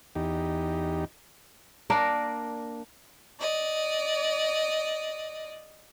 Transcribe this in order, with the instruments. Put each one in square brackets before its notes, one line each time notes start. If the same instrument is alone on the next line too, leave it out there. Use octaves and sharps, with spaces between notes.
[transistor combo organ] E2 D#4 G4
[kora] A#3 D4 A#4
[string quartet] D5 D#5